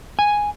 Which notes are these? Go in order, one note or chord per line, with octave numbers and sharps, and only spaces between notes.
G#5